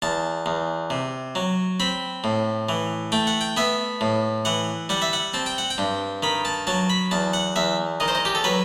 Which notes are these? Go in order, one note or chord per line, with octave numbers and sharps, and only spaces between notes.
E2 A5
E2
C3
F#3
C4 B5
A2
E3
A3 G5
F#5
G5
B3 E5
A2
E3 F#5
G3 F#5
E5
F#5
C4 A5
G5
F#5
G5
G2
D#3 B5
A5
F#3 A5
B5
E2 A5
F#5
E2 E5
D#3 D#5
C5
D#5
G4
A4
F#3 B4